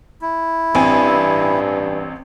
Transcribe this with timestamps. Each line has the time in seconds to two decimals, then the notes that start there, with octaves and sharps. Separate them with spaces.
0.22 E4
0.75 A1 G2 C4 G#5